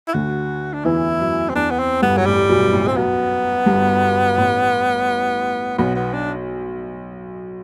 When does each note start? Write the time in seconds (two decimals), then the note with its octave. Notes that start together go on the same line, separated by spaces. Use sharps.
0.08 E4
0.14 D2 D3 F#4
0.74 D4
0.84 E2 E3 E4
1.20 F#2
1.49 C4
1.55 E2 D4
1.71 B3
1.79 C4
2.02 G1 G2 B3
2.17 F#3
2.26 A1 A2 G3
2.49 B1 B2
2.73 A1 A2
2.88 C4
2.96 F#2 B3
3.66 G1 G2
4.38 A1 A2
5.78 B1 B2 B3
5.96 B3
6.13 D4